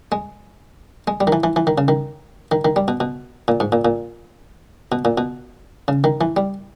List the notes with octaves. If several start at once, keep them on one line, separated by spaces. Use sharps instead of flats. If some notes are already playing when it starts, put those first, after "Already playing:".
G#3
G#3
G3
D#3
E3
E3
E3
D#3
C#3
D#3
D#3
D#3
G3
B2
B2
A#2
G#2
A#2
A#2
B2
A#2
B2
C#3
D#3
E3
G3